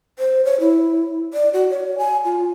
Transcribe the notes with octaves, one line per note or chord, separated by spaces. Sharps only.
C5
C#5
E4
D5
F#4
C#5
G#5
F4